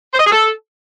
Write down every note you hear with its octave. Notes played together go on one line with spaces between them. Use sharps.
C5
D#5
G#4
A4